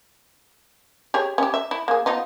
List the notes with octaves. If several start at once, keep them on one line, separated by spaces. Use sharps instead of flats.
G4 G#4 C#5
C#4 G4
E5
E4
A#3 G#4
B3 D#4 F4